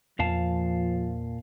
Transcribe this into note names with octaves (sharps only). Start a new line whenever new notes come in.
E2 A#2 F3 F5 A5